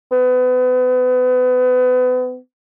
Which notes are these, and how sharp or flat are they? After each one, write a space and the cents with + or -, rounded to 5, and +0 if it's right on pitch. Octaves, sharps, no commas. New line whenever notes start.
B3 +35